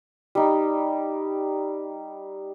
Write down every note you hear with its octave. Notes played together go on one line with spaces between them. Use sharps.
G3 D#4